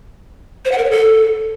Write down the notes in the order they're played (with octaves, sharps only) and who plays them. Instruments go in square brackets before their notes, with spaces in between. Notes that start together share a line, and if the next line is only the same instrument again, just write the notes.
[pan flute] C5
F#5
A#4
C#5
A4